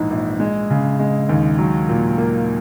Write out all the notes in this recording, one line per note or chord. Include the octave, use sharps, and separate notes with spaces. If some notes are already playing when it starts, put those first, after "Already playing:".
Already playing: A#1 G#2 E3
A#1
G#3
C#3
G#3
D#2
F#3
A#2
A#3